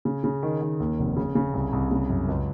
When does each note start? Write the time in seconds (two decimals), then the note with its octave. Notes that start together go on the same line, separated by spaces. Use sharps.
0.05 C#3
0.24 C#3
0.43 D#3
0.61 D#3
0.80 D#2
0.99 F1
1.17 C#3
1.35 C#3
1.54 C2
1.73 C2
1.91 C#3
2.10 F#2
2.28 C#2